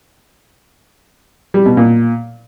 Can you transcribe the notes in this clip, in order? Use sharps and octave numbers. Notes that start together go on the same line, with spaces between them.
G3
B2
A#2